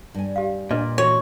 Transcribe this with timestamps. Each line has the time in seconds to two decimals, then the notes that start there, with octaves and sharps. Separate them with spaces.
0.14 G2 G#5
0.36 G4 F5
0.71 A#2 D4 B4 D#5
0.98 E3 F#4 C#5